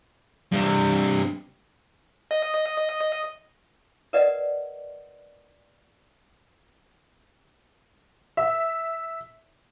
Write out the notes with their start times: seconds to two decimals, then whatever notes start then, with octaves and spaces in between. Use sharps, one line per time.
0.52 G2 C3
2.31 D#5
4.13 A#4 B4 D5 D#5 F#5
8.37 E5